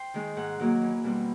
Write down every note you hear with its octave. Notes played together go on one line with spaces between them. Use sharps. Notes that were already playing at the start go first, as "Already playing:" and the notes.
Already playing: C5 G5
D#3 G#3
G#2 F#5
D#3 F#3 A#3
E2
B2 G3 C4